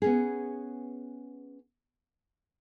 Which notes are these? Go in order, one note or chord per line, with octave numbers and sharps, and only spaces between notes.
B3 C#4 G#4